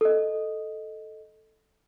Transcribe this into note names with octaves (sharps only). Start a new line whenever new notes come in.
A4 D#5